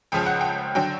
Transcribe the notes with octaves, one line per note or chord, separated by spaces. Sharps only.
C#2 C#3 F3 G5
F#5
G5
D3 F#3 G5